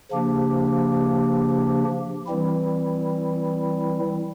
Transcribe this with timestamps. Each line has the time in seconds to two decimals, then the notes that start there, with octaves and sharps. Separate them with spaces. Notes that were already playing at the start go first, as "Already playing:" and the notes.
0.12 C#3 F3 A#3 D4 G4
2.26 E3 G3 C4 E4